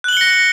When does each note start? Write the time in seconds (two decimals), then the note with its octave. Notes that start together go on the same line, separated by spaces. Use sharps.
0.04 F#6
0.08 F#7
0.13 G7
0.17 C#7
0.21 A#6